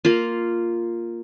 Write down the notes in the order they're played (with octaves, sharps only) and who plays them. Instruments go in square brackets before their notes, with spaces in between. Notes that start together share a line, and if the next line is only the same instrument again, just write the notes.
[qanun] A#3 F4